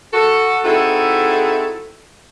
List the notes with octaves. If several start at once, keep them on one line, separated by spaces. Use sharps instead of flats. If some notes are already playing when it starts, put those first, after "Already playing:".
F#4 A4
C4 D#4 E4 F#4 G#4 A4